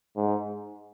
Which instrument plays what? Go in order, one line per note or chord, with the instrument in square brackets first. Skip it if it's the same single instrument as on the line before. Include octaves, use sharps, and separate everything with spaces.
[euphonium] G#2